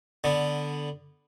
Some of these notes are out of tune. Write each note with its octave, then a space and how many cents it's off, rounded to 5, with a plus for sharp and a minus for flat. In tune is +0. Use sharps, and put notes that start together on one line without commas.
D3 +0 B3 +0